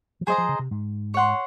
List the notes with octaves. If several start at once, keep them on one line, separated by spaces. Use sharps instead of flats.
F3
F#3 G#4 C5 D#5 A#5
F3
C#3
C3
G#2
C#5 F#5 C6